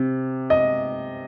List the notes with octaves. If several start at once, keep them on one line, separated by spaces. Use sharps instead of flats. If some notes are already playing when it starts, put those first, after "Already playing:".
Already playing: C3
D#5